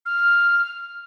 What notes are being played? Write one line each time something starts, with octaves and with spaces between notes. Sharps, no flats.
F6